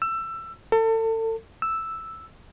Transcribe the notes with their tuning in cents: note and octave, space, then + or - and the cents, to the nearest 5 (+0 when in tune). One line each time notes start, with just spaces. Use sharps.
E6 +20
A4 +30
E6 +0